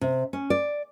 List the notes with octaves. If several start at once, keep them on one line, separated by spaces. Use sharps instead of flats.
C3
C#4
D5